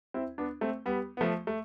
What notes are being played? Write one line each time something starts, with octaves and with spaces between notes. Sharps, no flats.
C4 E4
B3 D4
A3 C4
G3 B3
B3
F3 A3
A3